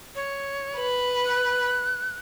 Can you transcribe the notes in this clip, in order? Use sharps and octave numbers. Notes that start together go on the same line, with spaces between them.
C#5
B4
F#6